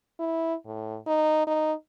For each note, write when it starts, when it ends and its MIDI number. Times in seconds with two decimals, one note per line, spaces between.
0.19 0.55 64
0.65 0.98 45
1.07 1.45 63
1.47 1.73 63